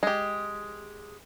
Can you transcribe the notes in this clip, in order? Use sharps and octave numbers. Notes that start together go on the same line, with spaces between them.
G#3 G4